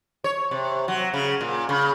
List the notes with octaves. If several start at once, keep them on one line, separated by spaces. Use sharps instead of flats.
C#5
C3
F#3
C#3
A#2
C#3